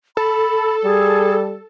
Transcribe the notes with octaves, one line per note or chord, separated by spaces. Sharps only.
A4 B5
G3 G#4